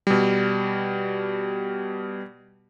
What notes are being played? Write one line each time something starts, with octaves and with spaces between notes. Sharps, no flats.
B2 G3